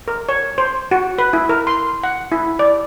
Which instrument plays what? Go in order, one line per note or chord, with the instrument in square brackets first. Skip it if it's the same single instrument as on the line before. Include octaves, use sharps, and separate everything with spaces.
[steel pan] A#4
C#5
C5
F#4
B4
E4
A#4
C6
F#5
E4
D5